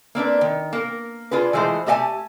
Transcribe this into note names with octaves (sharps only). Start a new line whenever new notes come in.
A#3 C4 D4 B4
D#3
A#3 A#4
D4 F4 G#4 B4
E3 F3 G#3 A3 C5
A3 G4 D#5 F5 G#5 A5